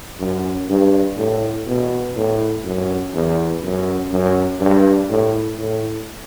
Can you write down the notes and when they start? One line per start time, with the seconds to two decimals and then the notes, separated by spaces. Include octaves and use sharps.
0.20 F#2
0.69 G2
1.18 A2
1.67 B2
2.16 A2
2.64 F#2
3.14 E2
3.63 F#2
4.12 F#2
4.61 G2
5.10 A2
5.59 A2